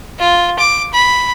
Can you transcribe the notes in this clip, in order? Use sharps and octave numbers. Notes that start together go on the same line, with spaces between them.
F4
D6
B5